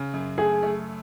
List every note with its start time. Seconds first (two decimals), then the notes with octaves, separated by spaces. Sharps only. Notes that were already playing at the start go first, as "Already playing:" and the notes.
Already playing: C#3
0.14 F#2
0.38 A3 G#4
0.63 A3